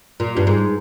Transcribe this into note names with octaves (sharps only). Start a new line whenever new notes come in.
A#2
G2
G#2